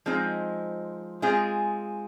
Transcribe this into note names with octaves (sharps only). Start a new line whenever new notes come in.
F3 G#3 C4 D#4
G#3 C4 F4 G#4